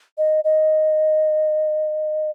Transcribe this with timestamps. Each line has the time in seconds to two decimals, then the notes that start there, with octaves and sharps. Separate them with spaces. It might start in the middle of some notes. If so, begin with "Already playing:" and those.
0.18 D#5
0.44 D#5